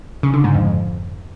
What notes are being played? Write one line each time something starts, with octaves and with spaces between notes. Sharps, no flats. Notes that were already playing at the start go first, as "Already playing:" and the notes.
C#3
D3
G#2
F2